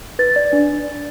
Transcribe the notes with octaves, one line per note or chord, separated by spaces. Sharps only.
B4 A6
D5
D4